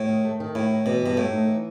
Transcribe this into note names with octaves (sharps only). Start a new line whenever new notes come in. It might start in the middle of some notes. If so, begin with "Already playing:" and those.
Already playing: A2
D#3
A3
D#3
A2 E4
D#3
B2 E3
G2 B2
A2 A3
D#4
E3